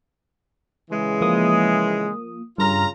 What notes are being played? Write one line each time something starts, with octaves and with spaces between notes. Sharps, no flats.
C#3 E3 G#3
F3 A#3 D#6
G2 C#3 F4 A#5 F6